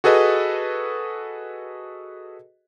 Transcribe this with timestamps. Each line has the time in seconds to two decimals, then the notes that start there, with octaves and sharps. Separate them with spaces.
0.04 F#4 G#4 A4 B4 D#5